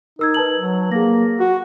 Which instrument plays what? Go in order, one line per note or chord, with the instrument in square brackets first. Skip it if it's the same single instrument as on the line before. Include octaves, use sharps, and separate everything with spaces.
[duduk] D#4 [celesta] A#4 E6 G#6
[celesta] B4 A5 F#7
[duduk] F#3
[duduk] A#3 [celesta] G#4 A#6
[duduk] F#4